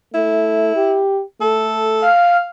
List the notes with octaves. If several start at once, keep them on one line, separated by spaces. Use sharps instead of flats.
A3 E4
G4
A3 A4
F5